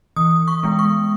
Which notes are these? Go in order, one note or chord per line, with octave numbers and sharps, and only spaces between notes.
E3 D#6
C#6
G#3 B3
C#6